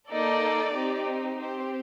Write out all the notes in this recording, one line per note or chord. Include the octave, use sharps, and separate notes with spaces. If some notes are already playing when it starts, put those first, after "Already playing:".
A#3 D#4 A4 D5
C4 D#4 G4
C4 G4 C5